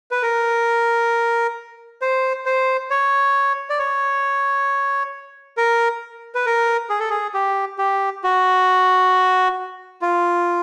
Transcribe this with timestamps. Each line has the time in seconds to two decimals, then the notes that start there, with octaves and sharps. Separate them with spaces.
0.11 B4
0.23 A#4
2.02 C5
2.46 C5
2.91 C#5
3.70 D5
3.79 C#5
5.57 A#4
6.35 B4
6.46 A#4
6.90 G#4
7.00 A4
7.10 G#4
7.34 G4
7.78 G4
8.24 F#4
10.02 F4